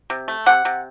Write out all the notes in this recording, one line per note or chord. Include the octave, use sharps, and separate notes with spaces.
C3
A3
C3 F#5
C3